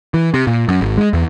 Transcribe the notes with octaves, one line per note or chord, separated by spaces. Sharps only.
E3
C3
A#2
F#2
G#1
G#3
E2